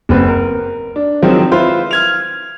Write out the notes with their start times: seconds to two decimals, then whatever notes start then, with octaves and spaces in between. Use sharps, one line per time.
0.09 F#1 C4 B4
0.28 A#4
0.96 D4
1.22 D#3 F3 F#3 G#3 C4
1.52 E4 F4 B4 C5
1.91 F6 G#6 F7